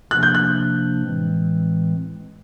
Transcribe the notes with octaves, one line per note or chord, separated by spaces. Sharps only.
C3 F3 A#3 D4 F#6
G6
F#6
A2 E3 G#3 C4